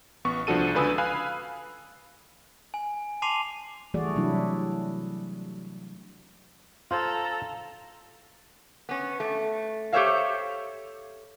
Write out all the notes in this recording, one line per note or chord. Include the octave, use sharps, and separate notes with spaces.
A1 B3 C#6
C2 F3 D4 F#4 A4 D#7
C#2 D3 B4 G#5 D#6 E6
F5 G#5 B5 F#6
G#5
A5 C6 D6 C7 D#7 F7
E3 G3 A3 F#4 G#4 D5
C3 F#3 G3 D4 E4
F4 A4 C5 A#5
B3 C#4
A3
G4 A4 C5 C#5 E5 F5